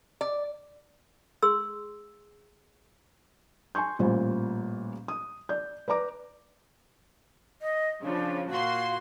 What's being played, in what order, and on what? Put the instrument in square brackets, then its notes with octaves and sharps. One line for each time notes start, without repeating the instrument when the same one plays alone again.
[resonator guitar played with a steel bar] D5
[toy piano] G#4 C6 E6
[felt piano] G#5 C6 C#6 G6
A1 A#2 G3 C5
D#6
D5 G6
B4 D5 A#5 D6
[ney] D#5
[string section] C#3 F3 [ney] D4
[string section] A#2 F#4 C6 [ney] F5